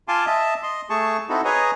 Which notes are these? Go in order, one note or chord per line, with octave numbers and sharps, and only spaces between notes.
F4 F5 G#5 A5 C6 D6
D#5 E5 A5
D#5 C6
A3 G#4 A5 C#6
C4 D#4 E4 F#4 A4
G#4 B4 C#5 D#5 G#5 A#5